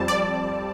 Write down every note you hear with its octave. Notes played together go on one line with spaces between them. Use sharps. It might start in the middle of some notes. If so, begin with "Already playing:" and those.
Already playing: F2 G3 C4 A5
D5